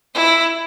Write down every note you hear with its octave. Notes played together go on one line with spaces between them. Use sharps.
E4